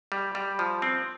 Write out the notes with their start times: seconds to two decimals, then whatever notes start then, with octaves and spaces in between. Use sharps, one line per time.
0.12 G3
0.35 G3
0.59 F3
0.82 C4